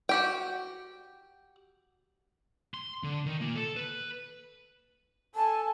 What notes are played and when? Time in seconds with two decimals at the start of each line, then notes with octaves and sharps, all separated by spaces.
0.09 F#4 G4 G5
2.74 C6
3.04 D3
3.26 D#3
3.41 A#3 F4
3.55 A4
3.76 B4
5.35 A4 G#5 A5